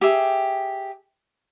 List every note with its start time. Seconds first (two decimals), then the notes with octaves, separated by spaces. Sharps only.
0.01 G4 G#4 E5